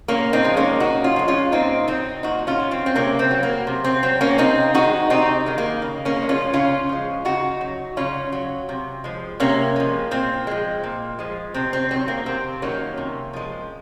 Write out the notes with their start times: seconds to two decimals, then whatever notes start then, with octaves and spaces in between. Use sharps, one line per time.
0.08 A#2 A#3 C#4
0.33 C4 D#4
0.44 F3 G#3
0.57 A#3 C#4
0.80 A#2 D#4 F#4
1.04 C#4 F4
1.16 F3 G#3
1.28 C#4 F4
1.52 A#2 C4 D#4
1.88 F#3 C4 D#4
2.23 A#2 D#4 F#4
2.47 C#4 F4
2.60 F#3
2.71 C4
2.86 C4
2.95 C3 A#3 C#4
3.19 C4
3.31 F#3
3.43 A#3
3.67 C3
3.84 C4
4.03 F#3 C4
4.21 A#3 C#4
4.38 C3 C4 D#4
4.74 D#3 G#3 D#4 F#4
5.10 C3 C4 D#4
5.46 D#3 G#3
5.58 A#3
5.82 C#3
6.05 A#3 C#4
6.17 F3
6.22 G#3
6.29 C#4 F4
6.53 C#3 C#4 F4
6.89 F3 G#3
7.25 C#3 D#4 F#4
7.61 F#3
7.97 C#3 C#4 F4
8.32 F#3
8.69 C3
9.04 F3 G#3
9.40 C3 A#3 C#4
9.76 F3 G#3
10.11 A#2 C4
10.47 F3 G#3
10.84 A#2
11.19 F3 G#3
11.54 C3 C4
11.73 C4
11.91 D#3 F#3 C4
12.08 A#3
12.26 C3 C4
12.62 D#3 F#3 A#3 C#4
12.97 C3
13.33 F3 G#3